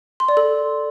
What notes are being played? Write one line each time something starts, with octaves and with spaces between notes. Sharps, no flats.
C6
D5
A4